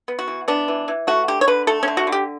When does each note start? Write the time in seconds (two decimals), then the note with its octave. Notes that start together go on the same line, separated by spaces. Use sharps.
0.08 B3
0.19 F#4
0.28 E3
0.48 B3 D4
0.68 E3
0.88 E3
1.07 A3 F#4
1.28 D3 G4
1.41 C#5
1.48 D3 B4
1.67 A3 A4
1.83 C#4
1.88 D3
1.97 F#4
2.07 D3
2.12 G4